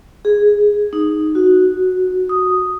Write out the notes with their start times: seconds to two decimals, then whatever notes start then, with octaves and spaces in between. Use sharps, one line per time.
0.25 G#4
0.93 D#4
1.35 F#4
2.29 D#6